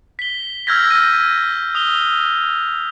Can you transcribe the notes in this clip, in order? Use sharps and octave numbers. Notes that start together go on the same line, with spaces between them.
B6 G7
E6 F6 G6 G#6 A#6 B6
G6 G#6 A#6 D#7
D#6 F7 G7